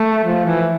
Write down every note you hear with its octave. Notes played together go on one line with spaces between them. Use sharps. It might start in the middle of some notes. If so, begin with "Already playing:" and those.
Already playing: A3
F3
E3